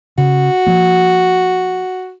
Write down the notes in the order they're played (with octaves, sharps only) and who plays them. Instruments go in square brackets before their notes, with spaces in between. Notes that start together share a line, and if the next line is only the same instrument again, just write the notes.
[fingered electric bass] C#3 [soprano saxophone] F#4
[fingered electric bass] F3 A#3